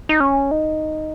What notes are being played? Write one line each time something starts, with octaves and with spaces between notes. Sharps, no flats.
D#4
C#4
D#4